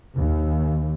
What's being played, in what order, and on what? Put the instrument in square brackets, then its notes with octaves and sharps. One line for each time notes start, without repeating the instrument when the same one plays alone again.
[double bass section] D#2